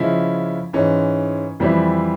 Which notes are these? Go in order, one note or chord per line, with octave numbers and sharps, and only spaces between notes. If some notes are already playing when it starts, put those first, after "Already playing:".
Already playing: C#3 F3 G#3 E4
G#2 E3 G#3 C#4
F2 E3 G3 C4 E4